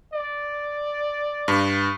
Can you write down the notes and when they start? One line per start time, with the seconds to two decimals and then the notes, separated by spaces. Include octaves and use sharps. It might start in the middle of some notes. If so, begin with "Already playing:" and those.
0.13 D5
1.48 G2